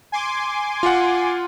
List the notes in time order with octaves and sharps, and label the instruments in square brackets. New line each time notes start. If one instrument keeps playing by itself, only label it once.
[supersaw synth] G#5 C6 D6
[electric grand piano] F4 F#5